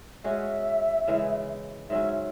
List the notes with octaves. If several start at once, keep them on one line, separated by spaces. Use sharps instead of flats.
G#3 C#4 F#4 E5
C#3 E3 G#3
G#2 F#3 C#4 E5